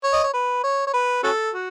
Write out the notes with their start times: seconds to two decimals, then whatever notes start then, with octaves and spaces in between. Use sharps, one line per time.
0.04 C#5
0.13 D#5
0.24 C#5
0.33 B4
0.64 C#5
0.87 C#5
0.93 B4
1.23 C#4 F#4 A4
1.54 F#4